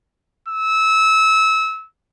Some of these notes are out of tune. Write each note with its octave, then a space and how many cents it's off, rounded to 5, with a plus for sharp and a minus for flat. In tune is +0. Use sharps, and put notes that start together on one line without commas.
E6 -25